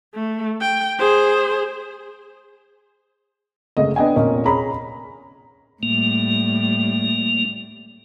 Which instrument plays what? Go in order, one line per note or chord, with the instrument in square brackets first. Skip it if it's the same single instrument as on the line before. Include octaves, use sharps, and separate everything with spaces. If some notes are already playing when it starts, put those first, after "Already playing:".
[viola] A3
G5
G#4 C5
[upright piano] F#1 G#3 A3 D#5
B3 D4 D#5 G5 G#5
F1 A#2 C#4 A#4 D#5
C#4 G#4 A#5 B5
[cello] A2 G3 [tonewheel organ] A#3